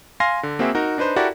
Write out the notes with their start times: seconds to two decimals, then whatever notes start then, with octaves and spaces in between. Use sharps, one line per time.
0.20 F5 G#5 C6 A#6
0.43 D3
0.59 A#3 C4 F#4 G#4 E5
0.75 D#4 F#4 A#4
0.98 D4 D#4 B4 C5
1.16 E4 F#4 G4 A4 A#4 D5